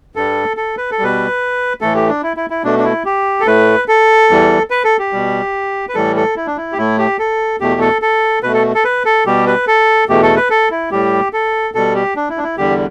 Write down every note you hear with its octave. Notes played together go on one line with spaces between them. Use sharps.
G2 G3 A4
A4
B4
A4
B2 G3 B4
A2 E3 A3 A4
G4
D4
E4
E4
E4
B2 A3 D4
D4
E4
G4
A4
A2 A3 B4
A4
E2 E3 G3
B4
A4
G4
B2 G3
B4
A2 E3 G3 A4
A4
E4
D4
E4
G4
A2 A3 E4
G4
A4
E2 B2 A3 G4
A4
A4
B2 A3 B4
A4
A4
B4
A4
B2 G3 G4
B4
A4
E2 B2 A3 G4
A4
B4
A4
E4
A2 G3 G4
A4
B2 G3 A4
G4
D4
E4
D4
E4
E2 D3 G3 G4